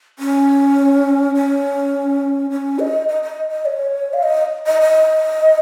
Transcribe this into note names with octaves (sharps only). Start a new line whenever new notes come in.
C#4
C#4
C#4
D#5
D#5
D#5
D#5
C#5
F5
D#5
D#5
D#5